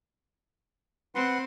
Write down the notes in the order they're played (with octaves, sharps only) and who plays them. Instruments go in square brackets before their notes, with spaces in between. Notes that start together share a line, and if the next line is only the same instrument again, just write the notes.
[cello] C4 [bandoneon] B4 F#5 C6